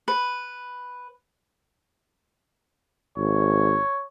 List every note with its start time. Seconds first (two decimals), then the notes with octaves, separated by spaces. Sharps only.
0.08 B4
3.17 G#1 C#5